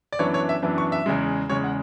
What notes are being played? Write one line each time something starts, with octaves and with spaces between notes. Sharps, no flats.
D5
F#2 E3 B3 D4 C#5
C#5
E5
F#2 E3 B3 D4
C#6
E5
E2 C#3 G#3
E2 C#3 G#3 C#5
F#5